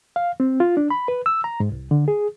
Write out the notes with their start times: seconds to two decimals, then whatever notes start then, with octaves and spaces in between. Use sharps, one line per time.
0.16 F5
0.40 C4
0.60 F4
0.77 D4
0.90 B5
1.08 B4
1.26 E6
1.44 A#5
1.60 G#2
1.72 C2
1.91 D3
2.08 G#4